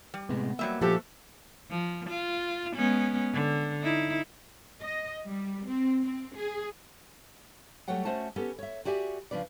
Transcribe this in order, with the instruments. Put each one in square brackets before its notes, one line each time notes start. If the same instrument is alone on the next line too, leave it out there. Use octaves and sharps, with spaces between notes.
[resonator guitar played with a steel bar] G3
[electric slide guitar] A2 C3 G#3 [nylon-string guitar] B3
[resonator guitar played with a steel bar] F#3 G3 E5 [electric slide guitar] A#3
[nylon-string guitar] A#2 F3 [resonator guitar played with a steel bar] A3 F#4 A4 [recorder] G4
[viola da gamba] F3
F4
G#3 B3 C#4
D3
D#4 E4
[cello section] D#5
G3
C4
C4
G#4
[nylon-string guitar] F#3 G3 A3 C#5 F#5 G5
A3 C#4 F#4 C5 F#5 A5
B3 C#4 G4 A4
C#5 E5
F#4 G4 D5 E5 G#5
C#3 F3 D4 B4 D5